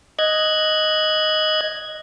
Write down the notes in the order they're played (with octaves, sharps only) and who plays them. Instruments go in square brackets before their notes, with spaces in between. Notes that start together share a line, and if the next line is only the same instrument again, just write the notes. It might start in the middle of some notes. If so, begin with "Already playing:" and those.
[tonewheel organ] D#5 F#6 G#6